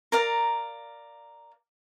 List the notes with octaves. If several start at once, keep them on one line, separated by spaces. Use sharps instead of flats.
A#4 D5 F5 A#5